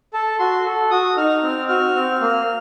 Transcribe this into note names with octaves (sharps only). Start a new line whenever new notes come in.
A4 A5
F#4 C6
A4
F#4 D#6
D#4 F6
C4
F#4 F6
C4
A#3